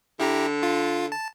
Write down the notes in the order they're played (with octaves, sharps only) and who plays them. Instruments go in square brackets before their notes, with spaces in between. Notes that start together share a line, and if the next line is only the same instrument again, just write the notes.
[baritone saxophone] D3 [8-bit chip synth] E4 G4 A#5
[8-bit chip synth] F4
A5